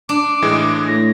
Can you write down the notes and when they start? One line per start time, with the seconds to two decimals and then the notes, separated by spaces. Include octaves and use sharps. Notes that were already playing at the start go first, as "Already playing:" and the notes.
0.09 D4 D6
0.42 A2 E3 G#3
0.87 A2 A#6